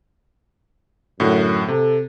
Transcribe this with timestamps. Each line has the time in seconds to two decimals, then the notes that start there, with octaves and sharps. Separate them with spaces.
1.20 F#2 A2 D3 F#4
1.68 C3 A4